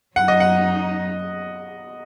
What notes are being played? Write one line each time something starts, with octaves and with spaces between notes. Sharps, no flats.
F#2 F#3 D#4 F#5
D#5
F#5